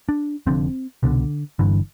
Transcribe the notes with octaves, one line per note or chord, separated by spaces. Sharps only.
D4
F1 F2 D3 C4
C2 B2 D3
G1 G2 D3 E3